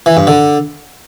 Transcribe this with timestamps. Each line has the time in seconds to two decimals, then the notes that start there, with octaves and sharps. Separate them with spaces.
0.06 E3
0.17 G2
0.27 D3